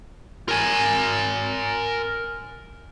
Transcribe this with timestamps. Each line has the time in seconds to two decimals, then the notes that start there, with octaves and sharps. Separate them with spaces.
0.48 A#4 G#5